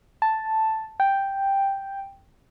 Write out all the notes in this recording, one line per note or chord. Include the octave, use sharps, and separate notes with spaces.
A5
G5